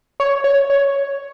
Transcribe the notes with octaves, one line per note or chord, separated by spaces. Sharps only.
C#5
C#5
C#5